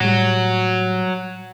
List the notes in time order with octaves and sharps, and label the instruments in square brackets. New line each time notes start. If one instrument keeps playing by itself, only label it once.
[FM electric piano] A2 G3 [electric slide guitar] F#3